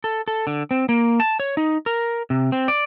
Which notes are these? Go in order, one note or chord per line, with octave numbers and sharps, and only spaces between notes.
A4
A4
D3
C4
A#3
A5
C#5
D#4
A#4
C3
C4
D5